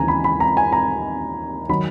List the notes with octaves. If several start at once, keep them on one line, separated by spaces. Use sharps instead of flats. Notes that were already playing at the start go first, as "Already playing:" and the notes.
Already playing: D#2 C#3 E3 G#5 A#5
B5
B5
A#5
G#5
A#5
D#3 F#3 B5